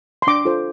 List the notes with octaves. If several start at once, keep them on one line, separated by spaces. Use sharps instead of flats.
C6
D4 D6
F4 A4 C5